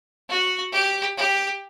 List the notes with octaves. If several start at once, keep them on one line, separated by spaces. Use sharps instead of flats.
F#4
G4
G4